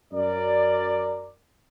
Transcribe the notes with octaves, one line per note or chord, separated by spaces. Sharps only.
F#2 A#4 D5